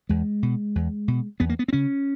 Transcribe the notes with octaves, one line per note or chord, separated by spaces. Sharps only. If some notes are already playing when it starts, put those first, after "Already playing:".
E2 G#3
B2
E2
B2
E2 B3
A#3
B3
C4
C#3 C#4